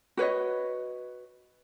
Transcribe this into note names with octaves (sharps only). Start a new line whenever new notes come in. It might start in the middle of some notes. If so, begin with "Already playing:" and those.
F#4 B4 C#5 D#5